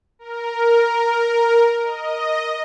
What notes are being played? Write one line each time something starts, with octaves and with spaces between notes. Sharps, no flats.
A#4
D#5